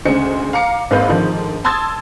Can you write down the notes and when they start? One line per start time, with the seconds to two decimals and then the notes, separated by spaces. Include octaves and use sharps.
0.05 D2 C#3 G#3 C5 C#7
0.53 F5 A#5 D6 C#7
0.91 G#1 G#2 A#3 B4 F5 G6
1.09 G#2 D3 D#3 F3
1.64 A5 C6 D#6 E6 G#6 A6